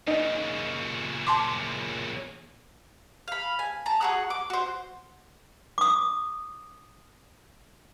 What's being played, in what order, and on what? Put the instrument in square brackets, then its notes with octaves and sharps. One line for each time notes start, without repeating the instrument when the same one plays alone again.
[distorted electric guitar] A#2 C#3 [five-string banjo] D#4
[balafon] A5 C6 D6
[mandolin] F5 B5
G#5
A5 A#5
F#4 G#4 F#5
D6
F#4 C5
[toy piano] D6 D#6